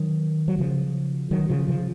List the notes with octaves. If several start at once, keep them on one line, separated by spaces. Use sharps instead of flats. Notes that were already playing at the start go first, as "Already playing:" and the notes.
Already playing: D#3 F#3
F#3
C#3 F3
D#3 F#3
C#3 F3
C#3 F3